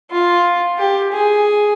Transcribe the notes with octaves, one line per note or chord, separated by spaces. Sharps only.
F4
G4
G#4